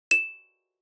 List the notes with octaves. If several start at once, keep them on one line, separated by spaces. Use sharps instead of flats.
E7